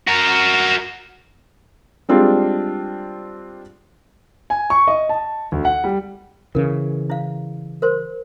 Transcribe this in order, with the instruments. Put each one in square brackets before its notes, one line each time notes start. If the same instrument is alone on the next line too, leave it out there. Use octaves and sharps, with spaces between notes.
[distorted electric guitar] F#4 A#4
[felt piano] G3 G#3 C4 D4 F4
[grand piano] G#5
C#6
D#5
A5
D2
F#5
G3
[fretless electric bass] C#3 E3 [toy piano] A#4
[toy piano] E4 F5
A#4 C5 C6